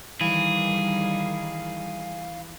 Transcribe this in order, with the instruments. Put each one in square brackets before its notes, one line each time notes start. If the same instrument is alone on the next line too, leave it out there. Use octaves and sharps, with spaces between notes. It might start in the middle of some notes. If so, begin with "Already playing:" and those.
[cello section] D#3 G3 [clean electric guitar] E3 [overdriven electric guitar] G#4 [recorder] F5